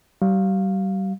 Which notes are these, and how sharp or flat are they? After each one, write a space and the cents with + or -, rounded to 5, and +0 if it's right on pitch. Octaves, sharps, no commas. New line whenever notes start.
G3 -35 F5 +0